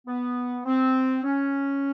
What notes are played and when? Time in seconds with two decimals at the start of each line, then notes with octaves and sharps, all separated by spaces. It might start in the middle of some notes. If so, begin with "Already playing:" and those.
0.07 B3
0.66 C4
1.23 C#4